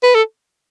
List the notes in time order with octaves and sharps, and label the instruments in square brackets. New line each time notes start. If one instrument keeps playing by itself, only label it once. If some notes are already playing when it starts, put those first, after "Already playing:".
[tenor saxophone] B4
A4